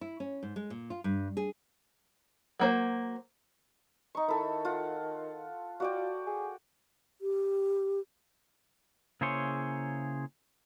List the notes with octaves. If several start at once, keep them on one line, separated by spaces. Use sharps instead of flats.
E4
C#4
G#2
G#3
A#2
F4
G2
G#4
F#3 A#3 C5
D#4 C#6
D#3 E4 A4
F4 F#5
F4 F#4 D5 G5
G#4
G4
C#3 A#3 E4 G#4 C5 C#5